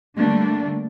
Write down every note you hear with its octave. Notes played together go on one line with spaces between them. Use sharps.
D3 G3 A3 A#3 D4